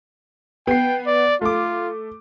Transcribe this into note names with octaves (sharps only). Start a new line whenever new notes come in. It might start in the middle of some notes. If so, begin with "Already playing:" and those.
B3 G5 C7
D5
A3 F4 D6